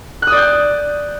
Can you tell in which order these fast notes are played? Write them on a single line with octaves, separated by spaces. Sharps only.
F#6 D#6 D5 G6